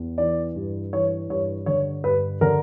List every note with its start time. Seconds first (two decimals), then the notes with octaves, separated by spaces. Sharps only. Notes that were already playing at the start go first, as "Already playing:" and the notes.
Already playing: E2
0.18 E3 D5
0.55 G2
0.93 E3 C#5
1.29 G2 C#5
1.66 D3 C#5
2.04 G2 B4
2.41 D3 A#4